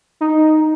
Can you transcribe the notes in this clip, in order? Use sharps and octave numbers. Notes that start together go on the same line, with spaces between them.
D#4